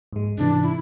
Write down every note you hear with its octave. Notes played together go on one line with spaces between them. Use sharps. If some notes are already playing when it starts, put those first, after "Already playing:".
G#2 G#3
G#2 C3 E3 D4
E4